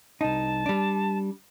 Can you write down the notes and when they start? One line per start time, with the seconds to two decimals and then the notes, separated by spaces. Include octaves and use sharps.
0.21 C2 D#4 A5
0.66 G3 D4